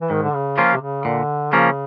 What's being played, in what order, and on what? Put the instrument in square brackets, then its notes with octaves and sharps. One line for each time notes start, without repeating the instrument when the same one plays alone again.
[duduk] E3
[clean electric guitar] G#2 [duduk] D#3
[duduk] D3
C#3
[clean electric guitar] F3 A#3 C#4 F4
[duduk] C3
C#3
[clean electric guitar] A#2 [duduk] D3
[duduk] C#3 [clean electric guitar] F3 A#3 C#4